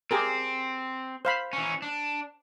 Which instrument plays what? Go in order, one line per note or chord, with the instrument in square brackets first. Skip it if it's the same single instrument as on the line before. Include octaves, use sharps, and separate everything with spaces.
[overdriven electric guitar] C4 [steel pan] G4 G#4 A#4
[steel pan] C5 F5 B5
[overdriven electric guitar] E3 C#4
D4